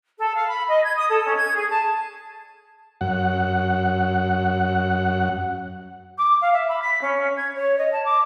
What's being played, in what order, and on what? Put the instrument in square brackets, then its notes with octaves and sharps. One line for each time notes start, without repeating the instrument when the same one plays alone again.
[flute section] A4
F5
B5
D#5
G#6
D#6
A4
C#4
G#6
G#4
A5
[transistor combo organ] F#2 F#5
[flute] D6
F5
E5
B5
B6
C#4
G#6
C#5
D#5
A5
D6